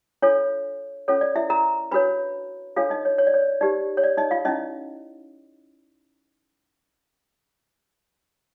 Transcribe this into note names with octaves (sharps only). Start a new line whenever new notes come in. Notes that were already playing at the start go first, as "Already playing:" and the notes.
D4 F4 A4 C#5
C#4 F4 A4 C#5
D5
E4 E5
A#4 A#5
D4 F#4 A#4 B4 C#5 B5
D4 F4 A4 C#5 F5
D#4 D#5
C#5
C#5
D5
C#5
D#4 G4 B4 D5
C#5
D5
D#4 D#5
F4 F5
C#4 D#4 E4 D#5